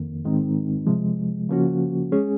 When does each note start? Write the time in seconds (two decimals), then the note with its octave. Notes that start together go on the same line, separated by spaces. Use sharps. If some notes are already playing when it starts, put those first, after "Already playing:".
Already playing: F2 D#3 A#3
0.25 G#2 D#3 G#3 C4 D#4
0.87 C3 F3 G#3
1.49 C#3 F3 A#3 C#4 F#4
2.12 G#3 C#4 G#4